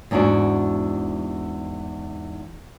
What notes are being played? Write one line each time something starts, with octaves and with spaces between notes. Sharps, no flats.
E2 G#2 D4 E4 F#4